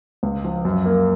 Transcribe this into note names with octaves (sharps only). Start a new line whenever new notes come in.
C#2
F3
F#2
A#3